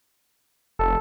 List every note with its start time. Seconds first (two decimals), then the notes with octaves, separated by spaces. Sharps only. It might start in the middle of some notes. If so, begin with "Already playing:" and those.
0.79 F1 A4